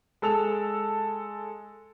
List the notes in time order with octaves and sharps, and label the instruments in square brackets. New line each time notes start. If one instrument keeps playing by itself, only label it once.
[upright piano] G#3 A4 E6 F7